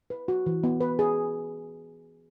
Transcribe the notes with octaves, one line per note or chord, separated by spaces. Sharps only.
B4
F#4
E3
B3
B4
G#4